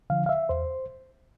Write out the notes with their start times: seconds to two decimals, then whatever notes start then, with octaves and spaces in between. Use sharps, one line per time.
0.10 D3 F3 F5
0.26 F5
0.29 E5
0.49 E2 C5